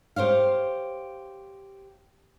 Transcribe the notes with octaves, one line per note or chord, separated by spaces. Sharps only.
G4 C5 C#5 F5